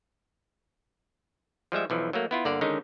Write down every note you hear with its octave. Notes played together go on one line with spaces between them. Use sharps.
F3 G3 G#3 E5
B1 E3 F3
F#3 A3 A#3
B3 E4 F4
G1 D3 A#3 D5 F#5
D3 D#3 G#3 C#4 D#4